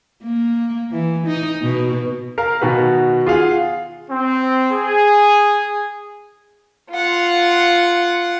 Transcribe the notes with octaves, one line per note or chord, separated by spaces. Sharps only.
A#3
E3
D#4
B2
A#4 F5 A#5
B2 D#3 F#4 B4
F4 G#4 F5 F#5
C4
G#4
F4 F#5